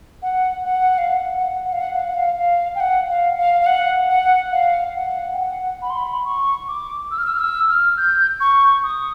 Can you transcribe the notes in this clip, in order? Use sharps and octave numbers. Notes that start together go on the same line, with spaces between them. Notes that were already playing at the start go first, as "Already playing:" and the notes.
F#5
F#5
F5
F#5
F#5
F#5
F5
F#5
F5
F#5
F5
F5
G5
F#5
F5
F5
F5
F#5
F#5
F5
F#5
G5
F#5
B5
C6
B5
C#6
D6
E6
F6
E6
F6
E6
F6
G6
C#6
D#6